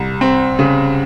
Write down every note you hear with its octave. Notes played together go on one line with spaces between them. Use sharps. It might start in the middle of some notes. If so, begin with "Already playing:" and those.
Already playing: C2
C4
C#3